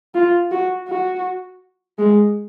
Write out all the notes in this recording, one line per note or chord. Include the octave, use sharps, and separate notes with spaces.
F4
F#4
F#4
G#3